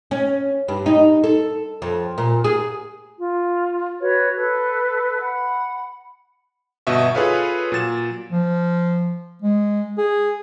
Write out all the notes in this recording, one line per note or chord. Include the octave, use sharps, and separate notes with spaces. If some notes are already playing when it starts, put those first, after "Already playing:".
C#4
G2
D#4
A4
F2
A#2
G#4
F4
F#4 B4 C#5
A4 B4
F#5 B5
G1 B2 D#5 E5 C#6
F4 G#4 A4 B4 C#5 F5
A#2 F#3 A6 E7
F3
G#3
G#4